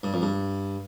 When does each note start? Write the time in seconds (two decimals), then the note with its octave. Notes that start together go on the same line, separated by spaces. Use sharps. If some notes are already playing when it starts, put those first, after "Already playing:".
0.03 G2
0.13 F2
0.22 G2